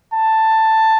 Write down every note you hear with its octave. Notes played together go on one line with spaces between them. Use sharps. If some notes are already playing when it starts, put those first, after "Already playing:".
A5